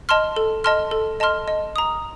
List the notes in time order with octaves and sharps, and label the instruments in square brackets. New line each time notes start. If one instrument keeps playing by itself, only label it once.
[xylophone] D#5 A5 C6 F6
A4
D#5 A5 C6 F6
A4
D#5 A5 C6 F6
D#5
A#5 D#6